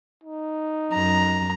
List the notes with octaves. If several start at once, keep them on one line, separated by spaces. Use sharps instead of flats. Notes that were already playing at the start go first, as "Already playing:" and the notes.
D#4
F#2 A#5